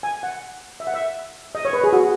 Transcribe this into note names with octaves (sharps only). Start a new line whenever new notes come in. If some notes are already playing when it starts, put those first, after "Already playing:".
G#5
F#5
E5
F#5
E5
D#5
C#5
B4
G#4
F#4